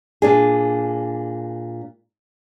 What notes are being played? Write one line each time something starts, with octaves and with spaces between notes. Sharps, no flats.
A#2 D4 G#4